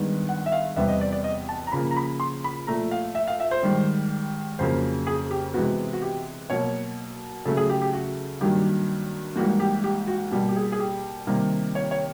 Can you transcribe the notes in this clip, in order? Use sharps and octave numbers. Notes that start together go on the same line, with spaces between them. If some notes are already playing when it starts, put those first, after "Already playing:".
Already playing: G2 D#3 G#3 B3
F#5
E5
F5
E2 C3 E3 G3 B3 E5
D#5
D5
D5
D#5
A5
A#5
C#3 F3 A#3 B5
A#5
B5
C6
B5
A#2 F3 A3 A#5
F5
E5
F5
E5
C5
G#2 D#3 G3
F2 C#3 F#3 A#3 C5
G#4
G4
C3 E3 G#3 B3 F#4
F#4
G4
B2 F#3 A#3 C#5
C#3 F#3 A3 A4
G#4
G4
G4
F#4
G2 D#3 F#3 A#3 G4
G#2 E3 G3 A#3 F#4
G4
G4
F#4
B2 G3 A#3 G4
G4
G#4
G#4
G4
C3 D#3 G3 A#3
C#5
C#5